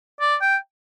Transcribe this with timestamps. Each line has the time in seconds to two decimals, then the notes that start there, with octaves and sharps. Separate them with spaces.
0.20 D5
0.41 G5